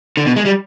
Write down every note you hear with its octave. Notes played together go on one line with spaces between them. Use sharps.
D3
B2
G#3
G3